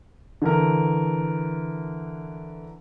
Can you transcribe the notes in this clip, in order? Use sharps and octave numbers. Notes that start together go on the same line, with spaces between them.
D3 E3 A#4